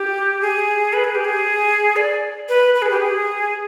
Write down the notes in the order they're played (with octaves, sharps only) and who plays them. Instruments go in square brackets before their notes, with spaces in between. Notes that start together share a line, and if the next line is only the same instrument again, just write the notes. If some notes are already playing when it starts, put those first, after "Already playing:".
Already playing: [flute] G4
G#4
B4
G#4
G4
G#4
D5
B4
B4
G#4
G4
G#4